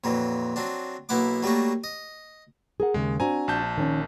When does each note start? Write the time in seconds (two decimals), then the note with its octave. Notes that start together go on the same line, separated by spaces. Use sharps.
0.04 F2 A#2 E3 F#3
0.56 F#3 C4 D4
1.09 B1 A#3 B3 E4 F#5 D6
1.43 F#3 G3 A3 A#3 F#4
1.84 D#5
2.80 G#4 A#4 F#5
2.94 D#2 C#3 G#3
3.20 C4 D4 F#4 G#5 A#5
3.48 A#1 A5 G6
3.78 D#3 C#4